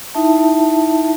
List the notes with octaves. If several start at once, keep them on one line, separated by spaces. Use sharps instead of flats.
D#4 E4 E5 A5